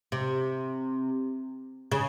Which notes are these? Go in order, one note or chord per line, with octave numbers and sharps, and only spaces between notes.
C3
C#3